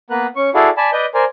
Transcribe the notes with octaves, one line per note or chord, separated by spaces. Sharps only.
A#3 B3 A#4 B4 F#6
C#4 C#6
E4 F#4 G#4 A4 D5 F5
D5 G#5 A5 B5
B4 D5 D#5 G6
A#4 C5 D5 G#5